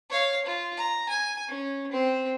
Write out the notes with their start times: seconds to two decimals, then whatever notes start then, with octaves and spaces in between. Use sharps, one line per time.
0.10 C#5 F5
0.46 F4
0.77 A#5
1.09 G#5
1.48 C#4
1.92 C4